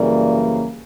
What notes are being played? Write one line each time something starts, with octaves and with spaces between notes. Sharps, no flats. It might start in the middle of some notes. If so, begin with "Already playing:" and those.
Already playing: F#2 C#3 E3 G3 A#3 D5